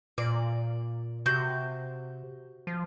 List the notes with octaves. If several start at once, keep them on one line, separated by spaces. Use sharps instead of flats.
A#2 D5
C3 F#4 G6
F3